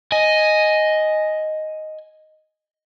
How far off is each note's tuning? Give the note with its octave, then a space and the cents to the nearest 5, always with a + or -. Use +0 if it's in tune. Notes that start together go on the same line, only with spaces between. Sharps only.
D#5 +0 G#5 +5